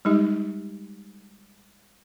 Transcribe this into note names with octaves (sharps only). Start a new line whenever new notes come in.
G3 G#3 D#4 G4